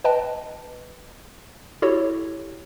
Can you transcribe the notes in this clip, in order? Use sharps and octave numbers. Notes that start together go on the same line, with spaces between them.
B4 D#5 G5 A5
E4 F#4 G4 A4 C#5